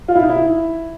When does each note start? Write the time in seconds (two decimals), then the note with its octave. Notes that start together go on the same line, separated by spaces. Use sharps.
0.08 F4
0.16 E4
0.23 D#4
0.30 E4